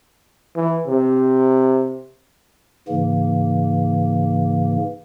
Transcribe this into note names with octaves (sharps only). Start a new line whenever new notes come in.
E3
C3
G#2 C#3 E3 A#3